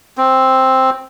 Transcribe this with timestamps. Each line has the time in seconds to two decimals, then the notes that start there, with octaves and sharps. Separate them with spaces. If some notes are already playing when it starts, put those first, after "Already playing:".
0.17 C4